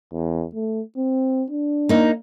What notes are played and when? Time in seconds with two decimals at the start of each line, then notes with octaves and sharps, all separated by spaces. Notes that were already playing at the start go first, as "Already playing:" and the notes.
0.13 E2
0.54 A3
0.97 C4
1.50 D4
1.89 A#3 D#4